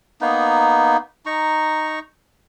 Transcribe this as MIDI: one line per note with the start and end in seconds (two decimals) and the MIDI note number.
0.21 0.97 58
0.21 0.97 59
0.21 0.97 63
1.26 1.99 63
1.26 1.99 82
1.26 1.99 85